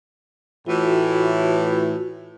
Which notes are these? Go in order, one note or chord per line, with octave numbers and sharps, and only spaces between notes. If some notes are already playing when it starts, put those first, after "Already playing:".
A2 E3 F4 F#4